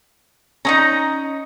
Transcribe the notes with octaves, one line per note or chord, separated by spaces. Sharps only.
C#4 D#4 D#5 A#5